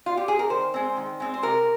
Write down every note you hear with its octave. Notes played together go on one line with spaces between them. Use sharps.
F4
G4
G#4
A#4
D#3 C5
G#3 C4
D#3
G#3 C4
C5
C3 A#4